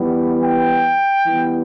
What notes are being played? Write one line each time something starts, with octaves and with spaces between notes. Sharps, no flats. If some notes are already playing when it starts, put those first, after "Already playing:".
Already playing: E3 G3 B3
G5
E3 G3 B3